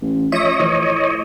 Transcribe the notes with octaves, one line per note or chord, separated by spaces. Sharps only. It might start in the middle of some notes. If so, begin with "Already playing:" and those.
A1
F3 C#5 D#5 E5 D#6
A2 E3 F3